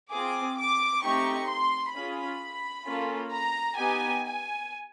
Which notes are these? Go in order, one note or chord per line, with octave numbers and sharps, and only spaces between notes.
C4 F4 G#4 D6
D6
A3 C4 D#4 G4 C#6
C6
C#4 F4 G#4 B5
A#3 C#4 F4 A4
A#5
B3 D#4 G4 G#5
G#5